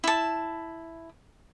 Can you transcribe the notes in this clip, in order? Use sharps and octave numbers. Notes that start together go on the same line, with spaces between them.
E4 A5